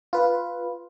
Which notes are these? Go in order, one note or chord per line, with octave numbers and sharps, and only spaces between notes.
F4 B4